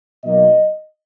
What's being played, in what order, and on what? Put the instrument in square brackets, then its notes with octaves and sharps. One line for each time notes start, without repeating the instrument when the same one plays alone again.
[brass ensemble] B2 F#3 A#3 D#4 D#5